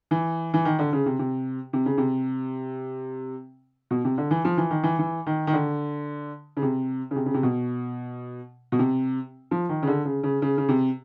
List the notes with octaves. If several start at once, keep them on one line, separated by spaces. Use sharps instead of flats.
E3
E3
D#3
D3
C#3
C3
C3
C3
C#3
C3
B2
C3
D3
E3
F3
E3
D#3
E3
E3
D#3
D#3
D3
C#3
C3
C#3
C3
C#3
C3
B2
B2
C3
F3
D#3
C#3
D3
C#3
C#3
C#3
C#3
C3